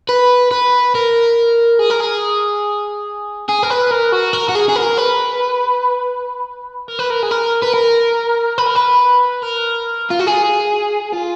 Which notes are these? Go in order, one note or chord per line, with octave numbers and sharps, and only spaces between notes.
B4
B4
A#4
G#4
A#4
G#4
G#4
A#4
B4
A#4
F#4
A#4
F#4
G#4
G#4
A#4
B4
A#4
B4
A#4
G#4
A#4
B4
A#4
B4
A#4
B4
A#4
F4
F#4
G#4
F4